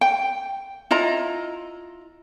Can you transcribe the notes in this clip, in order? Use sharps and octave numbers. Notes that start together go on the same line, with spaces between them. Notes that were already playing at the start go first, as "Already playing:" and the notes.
G5
E4 F4 D#5 A#5